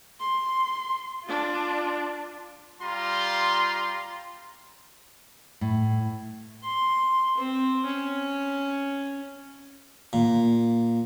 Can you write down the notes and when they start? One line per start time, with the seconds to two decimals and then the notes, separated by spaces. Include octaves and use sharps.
0.20 C6
1.24 D4 F4
2.80 G3 F4 A#5 C6
5.61 A2
6.64 C6
7.38 C4
7.86 C#4
10.13 A#2